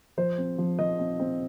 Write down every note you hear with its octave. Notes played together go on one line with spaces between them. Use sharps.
F3 C5
C4
F3
F3 D#5
C4
C4